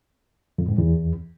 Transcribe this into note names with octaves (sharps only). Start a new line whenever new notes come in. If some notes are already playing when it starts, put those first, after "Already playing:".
F2
G#2
E2